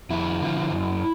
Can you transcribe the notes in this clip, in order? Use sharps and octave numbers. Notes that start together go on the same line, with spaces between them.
F2 E4
D3 F3
F#2